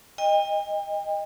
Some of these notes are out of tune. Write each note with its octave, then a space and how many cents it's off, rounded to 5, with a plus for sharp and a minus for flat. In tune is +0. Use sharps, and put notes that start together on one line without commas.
D#5 +0 G5 +40